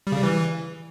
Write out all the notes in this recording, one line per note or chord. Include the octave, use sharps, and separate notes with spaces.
G3
C#3
G3
E3